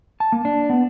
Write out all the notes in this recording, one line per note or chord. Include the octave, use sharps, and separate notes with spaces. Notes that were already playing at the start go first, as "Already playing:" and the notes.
A5
A#3
D4
B3